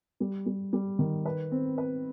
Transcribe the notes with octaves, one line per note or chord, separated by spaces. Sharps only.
G3
G3
G3
D#3
B4
C4
B4